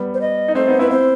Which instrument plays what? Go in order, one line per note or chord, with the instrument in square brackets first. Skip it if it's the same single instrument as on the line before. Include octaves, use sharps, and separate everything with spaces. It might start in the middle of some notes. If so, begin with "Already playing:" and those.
Already playing: [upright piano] G3 B3
[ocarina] C5
D#5
[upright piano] D#4
[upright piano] A3 C4 [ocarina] C5
[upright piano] B3 D#4
[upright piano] C4 E4 [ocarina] B4
[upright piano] C4 E4 [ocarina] C5